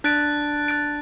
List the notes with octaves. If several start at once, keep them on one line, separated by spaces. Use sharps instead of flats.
D4 F#6 A6 D7
F#6 A6 D7